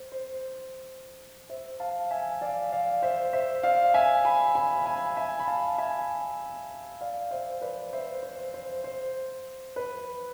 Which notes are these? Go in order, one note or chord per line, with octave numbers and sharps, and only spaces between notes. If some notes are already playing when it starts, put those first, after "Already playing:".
Already playing: C5
C5
C5 E5
F5 A5
E5 G#5
D5 F5
D5 F5
C5 E5
C5 E5
D5 F5
E5 G#5
G#5 B5
G#5 B5
G#5 B5
E5 G#5
B5
F5 A5
E5 G#5
D5 F5
C5 E5
B4 D5
C5 E5
C5
C5
C5
B4